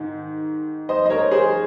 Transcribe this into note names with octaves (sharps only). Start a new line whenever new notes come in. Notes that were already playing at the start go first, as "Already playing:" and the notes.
Already playing: G#2 D#3
C5 D#5
D#5
A#4 C#5
G#4 C5